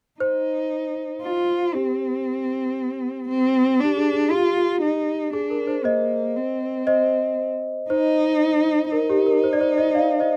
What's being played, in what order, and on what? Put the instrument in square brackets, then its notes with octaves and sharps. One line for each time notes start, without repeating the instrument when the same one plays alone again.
[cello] D#4 [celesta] C5
[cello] F4
[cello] C4 [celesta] G4
[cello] C4
[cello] D4 [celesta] G4
[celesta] G#4
G#4
[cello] F4 [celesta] G4
[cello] D#4
[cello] D4 [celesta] G#4
[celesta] A#4
C5
[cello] A#3 [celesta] C5 D#5
[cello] C4
[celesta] C5 D#5
[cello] D#4 [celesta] C5
[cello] D#4 [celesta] A#4
[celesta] G4
A#4
C5
D5
C5
C5 D#5
D5 F5
C5 D#5